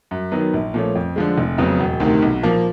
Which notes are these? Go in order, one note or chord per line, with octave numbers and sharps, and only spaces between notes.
F#2
D#3 F#3 B3
A#1
A#2 F3 A3 C#4
F2
D3 F3 G#3
F1
F2 C#3 F#3 B3
E1
D2 C3 D#3
B1
A#2 F3 A#3